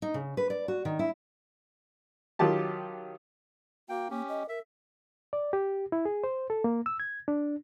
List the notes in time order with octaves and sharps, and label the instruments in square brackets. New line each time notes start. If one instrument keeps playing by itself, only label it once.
[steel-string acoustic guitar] D#4
C#3
B4
D5
F#4
D#3
E4
[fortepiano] D#3 F#3 F4 G4 A5
[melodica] A#3 G5 [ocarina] F#4
[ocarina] A#3 [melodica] C#4 G4
[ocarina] D#5
[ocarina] A#4 [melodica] E5
[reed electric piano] D5
G4
E4
G#4
C5
A4
A#3
E6
G#6
D4